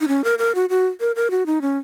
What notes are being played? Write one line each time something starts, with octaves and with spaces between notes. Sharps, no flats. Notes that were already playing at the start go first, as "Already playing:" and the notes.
D#4
C#4
A#4
A#4
F#4
F#4
A#4
A#4
F#4
D#4
C#4